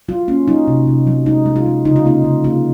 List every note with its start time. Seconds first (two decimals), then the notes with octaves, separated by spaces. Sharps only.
0.08 F#3 F4
0.28 A#3 C#4
0.48 F#3 D#4
0.68 C3
0.87 C3
1.07 F#3
1.26 G#3 D#4
1.46 G#3
1.56 F4
1.66 G#3
1.85 C#3 D#4
1.96 F4
2.05 A#3 D#4
2.24 C#3
2.44 A#3 F4